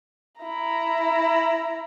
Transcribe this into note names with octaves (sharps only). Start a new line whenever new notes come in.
E4 A#5